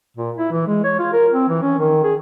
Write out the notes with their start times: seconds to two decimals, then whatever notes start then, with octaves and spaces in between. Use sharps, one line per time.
0.17 A#2
0.37 E4
0.51 E3
0.67 G#3
0.84 C#5
0.99 F4
1.13 A#4
1.32 C4
1.49 E3
1.63 C#4
1.79 D#3
2.04 G#4